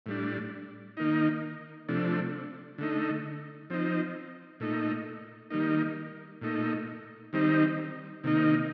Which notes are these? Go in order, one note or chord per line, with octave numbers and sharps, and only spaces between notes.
A2 G3 D4
D#3 A#3 D#4
C3 F3 A3 D4
D3 A3 D#4
F3 C4 D#4
A#2 A3 D#4
D#3 G3 A#3 D#4
A#2 A3 D#4
D#3 G3 C4 D#4
C3 D#3 A#3 D#4